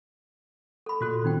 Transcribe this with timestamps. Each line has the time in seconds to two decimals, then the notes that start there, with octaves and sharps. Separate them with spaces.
0.86 A4 B5
1.01 A#2 F4 F#4 A4 F#6
1.25 D#3 C4 D#4 G5